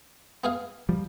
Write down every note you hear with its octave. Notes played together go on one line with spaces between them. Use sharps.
B3 G#4 F5
F3 G3